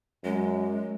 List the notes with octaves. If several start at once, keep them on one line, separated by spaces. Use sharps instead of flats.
F#2 G#3